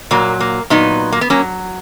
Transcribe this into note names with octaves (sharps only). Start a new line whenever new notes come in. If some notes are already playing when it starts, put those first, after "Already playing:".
A#2 F#3 A#3
A#3
A#2 F#3 B3 D#4
A#3
B3
F#3 A#3 C#4